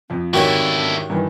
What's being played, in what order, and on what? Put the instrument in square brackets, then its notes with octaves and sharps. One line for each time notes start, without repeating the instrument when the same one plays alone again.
[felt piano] F2 F3 [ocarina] C4
[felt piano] G#2 D#3 A#3 [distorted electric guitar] D3 E4 [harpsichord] F#4 G4 C#5
[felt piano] G2 D#3 E3